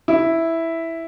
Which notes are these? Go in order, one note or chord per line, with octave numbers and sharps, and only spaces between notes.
E4